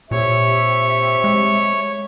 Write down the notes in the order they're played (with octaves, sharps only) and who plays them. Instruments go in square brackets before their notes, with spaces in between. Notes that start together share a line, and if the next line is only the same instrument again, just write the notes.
[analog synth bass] A#2 [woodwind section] C4 G4 E5 [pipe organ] C#5
[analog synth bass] G#3